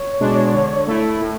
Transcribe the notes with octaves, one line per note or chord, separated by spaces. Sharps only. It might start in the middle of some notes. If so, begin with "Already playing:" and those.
Already playing: C#5
B2 G#3 D4
D3
A3 E4
A2